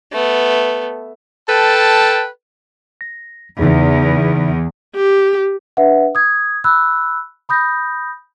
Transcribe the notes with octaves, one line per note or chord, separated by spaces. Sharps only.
A3 B3
A4 B4 G5 A5
A#6
E2 C#3 D#4 G#4
G4
D4 B4 E5 F#5
D#6 G#6
B5 E6 F#6
B5 D#6 G6 A#6